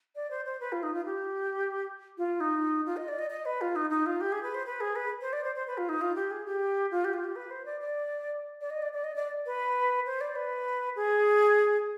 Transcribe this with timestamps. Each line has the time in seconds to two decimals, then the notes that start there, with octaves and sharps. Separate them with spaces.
0.16 D5
0.31 C5
0.45 C5
0.60 B4
0.72 F4
0.83 D#4
0.94 F4
1.05 G4
2.18 F4
2.40 D#4
2.86 F4
2.97 D#5
3.08 D5
3.19 D#5
3.30 D#5
3.45 B4
3.61 F4
3.76 D#4
3.90 D#4
4.06 F4
4.21 G4
4.32 G#4
4.43 B4
4.55 C5
4.66 B4
4.81 G#4
4.96 B4
5.21 C5
5.33 D5
5.44 C5
5.56 C5
5.67 B4
5.78 F4
5.89 D#4
6.01 F4
6.16 G4
6.31 G#4
6.46 G4
6.91 F4
7.05 G4
7.13 F4
7.24 G4
7.36 B4
7.51 C5
7.66 D5
7.80 D5
8.61 D5
8.70 D#5
8.82 D5
8.93 D5
9.04 D#5
9.16 D5
9.46 B4
10.06 C5
10.21 D5
10.35 B4
10.96 G#4